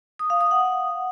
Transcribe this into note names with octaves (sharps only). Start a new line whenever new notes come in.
D#6
F5
D#6
F#5